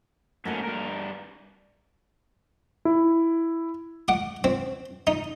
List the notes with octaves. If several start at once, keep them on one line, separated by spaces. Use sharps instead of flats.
G#2 A3 A#3 C#4 F#4 F5
G2 A#4
E4
F#5 D6
C4
D#4